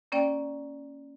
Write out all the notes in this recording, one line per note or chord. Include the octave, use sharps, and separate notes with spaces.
A#3 C#4 D5 G5